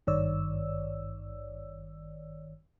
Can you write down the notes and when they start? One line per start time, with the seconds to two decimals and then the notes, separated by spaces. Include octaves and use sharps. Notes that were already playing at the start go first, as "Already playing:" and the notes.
0.07 G#1 G2 D#3 C#5 D5 E6